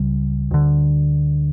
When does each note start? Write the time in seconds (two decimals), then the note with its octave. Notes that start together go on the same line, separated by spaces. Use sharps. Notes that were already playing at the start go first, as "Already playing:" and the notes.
Already playing: C#2 C#3 G3
0.51 D2 D3